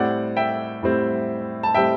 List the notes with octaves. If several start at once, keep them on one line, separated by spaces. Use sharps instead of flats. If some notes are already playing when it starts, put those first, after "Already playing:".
Already playing: A2 G3 C4 D5 F#5
E5 G5
A2 G3 C4
A5
A2 G3 C4 E5 G5